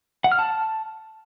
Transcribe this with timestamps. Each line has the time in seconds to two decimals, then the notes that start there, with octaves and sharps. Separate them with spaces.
0.24 F#5
0.32 F6
0.39 A5